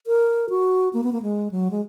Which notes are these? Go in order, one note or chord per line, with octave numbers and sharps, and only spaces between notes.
A#4
F#4
A#3
B3
A#3
G#3
F#3
G#3